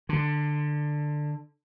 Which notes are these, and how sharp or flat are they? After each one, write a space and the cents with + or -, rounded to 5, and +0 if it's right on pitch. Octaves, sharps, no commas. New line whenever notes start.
D3 +15